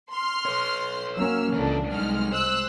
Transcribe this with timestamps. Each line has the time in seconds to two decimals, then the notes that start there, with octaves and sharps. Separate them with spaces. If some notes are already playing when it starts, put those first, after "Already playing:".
0.12 C6 F6
0.45 B4 C#5
1.15 F#3 A#3 C#4 E6 F6
1.54 C#2 C#3 E3 D4 A4
1.92 C2 F#3 G#3 D#4 F6
2.32 C5 E6 F#6